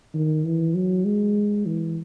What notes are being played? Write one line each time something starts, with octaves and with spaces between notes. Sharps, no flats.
D#3
E3
F#3
G#3
E3